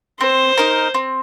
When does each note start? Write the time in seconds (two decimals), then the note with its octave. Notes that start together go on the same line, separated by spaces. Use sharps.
0.20 C4 C5
0.58 D#4 A#4
0.94 C4